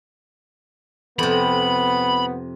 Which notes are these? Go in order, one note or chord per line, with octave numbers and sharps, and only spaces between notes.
F2 C3 B3 B5